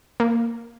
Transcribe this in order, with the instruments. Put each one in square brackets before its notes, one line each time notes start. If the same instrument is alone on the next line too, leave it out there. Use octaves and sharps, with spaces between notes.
[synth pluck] A#3